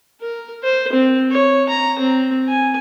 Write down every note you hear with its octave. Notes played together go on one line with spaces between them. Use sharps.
A#4
C5
C4
C#5
A#5
C4
G#5